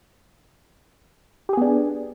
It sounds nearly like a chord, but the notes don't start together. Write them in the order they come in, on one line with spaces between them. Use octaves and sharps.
G4 G#4 B3 D4